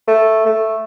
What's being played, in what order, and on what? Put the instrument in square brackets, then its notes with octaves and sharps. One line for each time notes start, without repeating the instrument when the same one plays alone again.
[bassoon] A3
A3